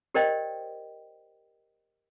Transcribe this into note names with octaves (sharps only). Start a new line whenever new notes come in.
G4 A#4 C5 D5 D#5 G5